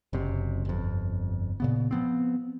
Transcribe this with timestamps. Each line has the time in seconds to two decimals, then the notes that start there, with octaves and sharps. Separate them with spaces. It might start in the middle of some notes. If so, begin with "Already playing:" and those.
0.13 F#1 F#2 C3
0.65 G1 F2
1.60 A#2 C#3 B3
1.91 F3 B3 C4